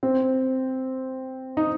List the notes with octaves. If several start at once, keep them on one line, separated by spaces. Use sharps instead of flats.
C4
D#4